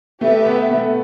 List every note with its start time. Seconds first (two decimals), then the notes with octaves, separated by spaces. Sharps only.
0.21 A3 G4 B4 E5
0.46 B3
0.71 A3